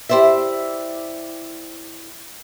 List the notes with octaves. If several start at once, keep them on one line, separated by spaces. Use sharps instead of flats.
E4 G4 C5 D5 E5